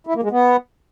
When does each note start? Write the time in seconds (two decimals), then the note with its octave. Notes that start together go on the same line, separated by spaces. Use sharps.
0.07 E4
0.15 A#3
0.23 G#3
0.31 B3